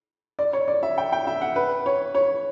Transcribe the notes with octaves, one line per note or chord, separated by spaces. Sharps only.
D5
C#5
D5
E5
G5
G5
E5
F#5
B4
C#5
C#5